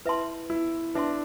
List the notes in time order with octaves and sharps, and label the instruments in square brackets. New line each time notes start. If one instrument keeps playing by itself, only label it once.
[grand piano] E4 [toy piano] B4 E5 A5 C6
[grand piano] E4
[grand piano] D4 [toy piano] B4 E5 A5 C6